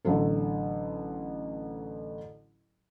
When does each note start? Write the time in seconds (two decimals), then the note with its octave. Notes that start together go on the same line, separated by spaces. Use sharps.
0.05 A1 D3 F#3 A4